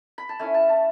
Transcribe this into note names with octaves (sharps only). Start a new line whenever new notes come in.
B5
A5
A3 C#4 E4 G#5
A5
A5